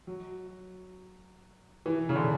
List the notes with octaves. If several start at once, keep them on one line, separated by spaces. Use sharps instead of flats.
F#3
E3
C#3
D3